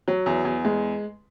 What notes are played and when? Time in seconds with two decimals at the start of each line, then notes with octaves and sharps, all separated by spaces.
0.08 F#3
0.26 E2
0.45 E2
0.65 G#3